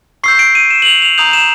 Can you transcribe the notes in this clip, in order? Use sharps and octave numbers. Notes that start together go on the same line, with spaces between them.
C#6 E6 G6 C7
D7
D#7
E7
F#7
F7
F7
A#5 D#6 G6 F7
E7